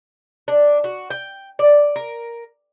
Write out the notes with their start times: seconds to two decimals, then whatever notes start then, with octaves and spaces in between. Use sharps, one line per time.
0.48 D4
0.84 F#4
1.10 G5
1.59 D5
1.96 A#4